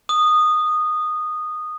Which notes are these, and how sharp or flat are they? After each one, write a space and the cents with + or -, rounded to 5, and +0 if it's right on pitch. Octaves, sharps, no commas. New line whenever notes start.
D#6 -15